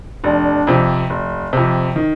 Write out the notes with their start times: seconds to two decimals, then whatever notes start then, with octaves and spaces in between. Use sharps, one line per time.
0.24 F1 D4
0.67 F2 C3
1.10 F1
1.53 F2 C3
1.96 D#3